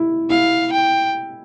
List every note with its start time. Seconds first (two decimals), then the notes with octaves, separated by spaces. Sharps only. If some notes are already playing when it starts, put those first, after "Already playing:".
Already playing: E4
0.30 E4 F5
0.71 G5